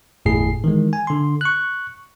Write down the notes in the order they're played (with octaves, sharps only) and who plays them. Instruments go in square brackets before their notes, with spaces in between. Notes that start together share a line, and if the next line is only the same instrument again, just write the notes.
[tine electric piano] G1 E2 A2 G#4 C7
D#3 E3 G#3
G#5
D3 C6
C#6 F#6